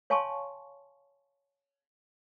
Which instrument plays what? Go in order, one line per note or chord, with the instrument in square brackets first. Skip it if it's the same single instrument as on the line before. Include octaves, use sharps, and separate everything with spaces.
[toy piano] C#5 F5 G#5 A5 C6 C#6